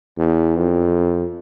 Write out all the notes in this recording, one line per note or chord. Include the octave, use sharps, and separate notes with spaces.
E2
F2